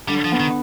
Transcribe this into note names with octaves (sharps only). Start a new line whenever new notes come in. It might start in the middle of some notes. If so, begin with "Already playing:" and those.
D3 G3
F3
B3
D#3